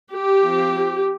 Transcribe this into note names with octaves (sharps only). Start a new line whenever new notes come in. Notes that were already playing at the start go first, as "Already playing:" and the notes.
G4
F3 C4